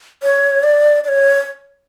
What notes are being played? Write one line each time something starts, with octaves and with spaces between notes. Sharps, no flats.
C#5
D5
D5
C#5